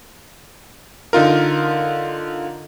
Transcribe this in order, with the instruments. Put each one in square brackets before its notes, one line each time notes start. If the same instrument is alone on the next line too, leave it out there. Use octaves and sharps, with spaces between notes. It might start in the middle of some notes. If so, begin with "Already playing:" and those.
[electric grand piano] D3 D#4 F4 A#4